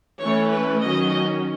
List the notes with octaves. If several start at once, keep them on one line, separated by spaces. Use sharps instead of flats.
E3 A3 C#4 C#5
B4
D#3 F#3 C#4 D#5